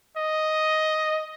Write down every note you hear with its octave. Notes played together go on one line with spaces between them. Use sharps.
D#5